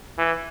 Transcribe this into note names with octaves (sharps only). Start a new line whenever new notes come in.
E3